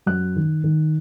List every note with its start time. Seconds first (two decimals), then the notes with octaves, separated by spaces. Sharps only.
0.06 F#2 F#6
0.36 D#3
0.64 D#3